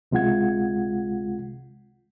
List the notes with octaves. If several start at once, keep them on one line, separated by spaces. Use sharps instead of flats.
C2 C3 G#3 F4 F#5 G#6